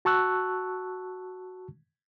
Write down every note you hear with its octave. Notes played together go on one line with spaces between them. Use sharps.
F#4 A5 C#6 E6 F#6